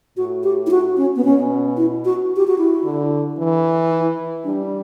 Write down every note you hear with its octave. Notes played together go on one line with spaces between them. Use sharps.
A2 F#4
G4
E4
F#4
C#4
B3
B2 C#4
E4
F#4
G4
F#4
E4
D3
E3
E4
G3 D4